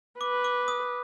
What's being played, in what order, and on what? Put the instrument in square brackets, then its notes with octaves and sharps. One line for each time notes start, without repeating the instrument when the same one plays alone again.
[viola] B4 [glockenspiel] D6
[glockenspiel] D6
D#6